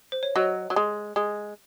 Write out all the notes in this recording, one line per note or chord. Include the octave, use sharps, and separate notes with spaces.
C5
C#5
F#3 D#5
F#3
G#3
G#3